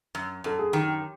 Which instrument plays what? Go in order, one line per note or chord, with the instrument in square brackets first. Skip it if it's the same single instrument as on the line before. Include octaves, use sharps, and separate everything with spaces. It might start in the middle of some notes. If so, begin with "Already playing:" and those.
[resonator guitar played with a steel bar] F#2
[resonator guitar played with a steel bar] F#2 [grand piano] A4
[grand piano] G#4
[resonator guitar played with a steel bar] D#3 [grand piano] G4